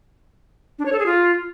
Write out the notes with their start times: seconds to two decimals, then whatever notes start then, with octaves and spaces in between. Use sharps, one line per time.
0.78 D4
0.85 C#5
0.92 A4
0.99 G#4
1.06 F4